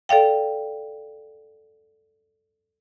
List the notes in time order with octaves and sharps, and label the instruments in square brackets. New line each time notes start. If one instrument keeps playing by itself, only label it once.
[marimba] A4 D5 F5 G5